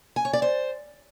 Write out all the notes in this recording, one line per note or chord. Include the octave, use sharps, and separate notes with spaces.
G#5
C#5
D5
C5